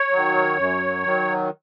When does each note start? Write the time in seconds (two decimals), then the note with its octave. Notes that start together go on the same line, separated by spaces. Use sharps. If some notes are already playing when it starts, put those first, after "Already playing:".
Already playing: C#5
0.10 D#3 F#3
0.57 F#2
1.04 D#3 F#3